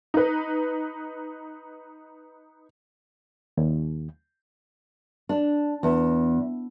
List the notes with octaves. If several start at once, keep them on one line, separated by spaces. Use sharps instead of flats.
D#4 B4
D#2
D4
E2